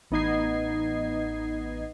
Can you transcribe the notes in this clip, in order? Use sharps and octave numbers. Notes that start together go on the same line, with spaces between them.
A1 B3 D#4 D#5 G#6 C7